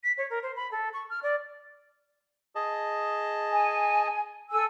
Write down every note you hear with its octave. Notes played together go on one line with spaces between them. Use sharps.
B6
C#5
A#4
C5
B5
A4
C#6
F6
D5
G#4 D#5 A5
G#5
A4 G#5 E6